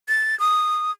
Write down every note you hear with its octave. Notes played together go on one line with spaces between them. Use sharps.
A6
D#6